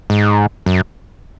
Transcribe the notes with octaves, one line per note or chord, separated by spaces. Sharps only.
G#2
F#2